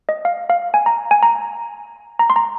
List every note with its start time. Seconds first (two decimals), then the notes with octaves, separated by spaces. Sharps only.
0.09 D#5
0.25 F5
0.50 F5
0.74 G#5
0.86 A#5
1.11 G#5
1.23 A#5
2.19 A#5
2.30 C6
2.36 A#5